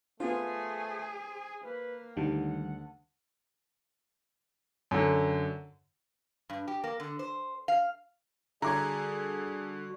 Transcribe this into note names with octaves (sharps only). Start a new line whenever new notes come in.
A3 B3 F4 G#4 C5
A#3 B4
D2 D#3 G3 F#5
F#2 D3
G2
G4
A#3
D3
C5
F5
D3 G3 F#4 G#4 A#5 D6 G#6